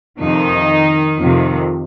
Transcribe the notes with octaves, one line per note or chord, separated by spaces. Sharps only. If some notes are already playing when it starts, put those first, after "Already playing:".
F2 C3 D#3 F3 D#4
F2 C3 D#3